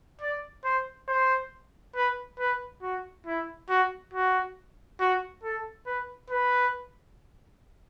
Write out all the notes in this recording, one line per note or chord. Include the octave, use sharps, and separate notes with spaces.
D5
C5
C5
B4
B4
F#4
E4
F#4
F#4
F#4
A4
B4
B4